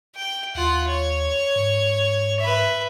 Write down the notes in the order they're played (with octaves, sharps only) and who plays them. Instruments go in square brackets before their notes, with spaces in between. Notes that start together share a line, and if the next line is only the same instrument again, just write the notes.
[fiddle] G5
[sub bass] D#2 [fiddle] F4 F#5
[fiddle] C#5
[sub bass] G#2
[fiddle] B4 E5